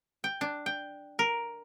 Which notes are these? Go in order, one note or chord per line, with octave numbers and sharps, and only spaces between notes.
G5
D4
G5
A#4